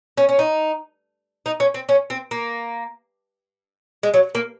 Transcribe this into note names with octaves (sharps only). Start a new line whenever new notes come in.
C#4
C#4
D#4
D#4
C#4
C4
C#4
C4
A#3
G#3
F#3
A#3